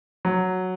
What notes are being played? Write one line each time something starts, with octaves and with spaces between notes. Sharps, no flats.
F#3